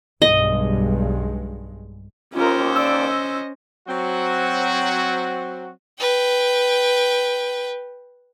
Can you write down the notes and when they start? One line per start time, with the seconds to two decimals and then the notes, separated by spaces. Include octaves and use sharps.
0.22 B1 G2 G#3 D#5
2.34 D#2 C#4 F4 A#4 C5
2.76 D5 E6
3.10 D#5
3.89 F#3 C4 F#4
6.00 B4 G5